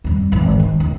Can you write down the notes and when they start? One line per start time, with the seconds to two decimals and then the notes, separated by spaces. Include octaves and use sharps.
0.04 F2 G3
0.32 G#1 E3
0.60 D#3
0.80 C#2